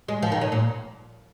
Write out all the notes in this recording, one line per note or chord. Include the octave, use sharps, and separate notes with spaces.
G#3
F3
D#3
C#3
A#2